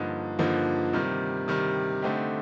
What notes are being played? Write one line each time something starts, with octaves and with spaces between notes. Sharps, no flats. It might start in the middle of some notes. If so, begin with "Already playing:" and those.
Already playing: G2 D3 F3 A#3 D#4
G2 D3 F3 A#3 D#4
C3 D#3 G3
C3 D#3 G3
D3 A3 C4 D#4 G4